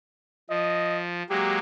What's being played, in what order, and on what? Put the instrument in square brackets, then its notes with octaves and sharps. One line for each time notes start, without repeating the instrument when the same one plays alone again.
[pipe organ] F3 [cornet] D#5
[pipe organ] F#3 G#3 A#3 [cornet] G4